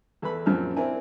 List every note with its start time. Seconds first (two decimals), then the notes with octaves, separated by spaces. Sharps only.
0.22 E2 A4 B4 B5
0.46 A#1 F#2 F3 C4 F6
0.76 C4 D4 E4 A#4 G#5